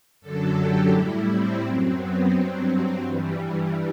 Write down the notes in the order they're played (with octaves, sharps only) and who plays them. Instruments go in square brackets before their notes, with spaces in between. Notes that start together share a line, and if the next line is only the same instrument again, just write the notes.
[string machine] F#2 D3 F#3 A4
G4
A2 G3 E4
C4
F#2 F#3 C4
B3
G2 F#3 C4
C4
G2 E3 G3